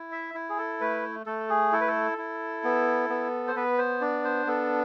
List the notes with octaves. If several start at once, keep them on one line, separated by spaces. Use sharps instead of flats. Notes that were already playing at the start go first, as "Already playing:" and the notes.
Already playing: E4
E5
E4
G#4
A4
A3 B4
A3 A4
G#4
E4 A4
B4
A4
E4
B3
B3
C5
B3 B4
C5
D4 D5
C5
B3 A4